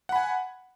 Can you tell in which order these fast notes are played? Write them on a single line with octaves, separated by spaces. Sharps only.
F#5 B5 G#5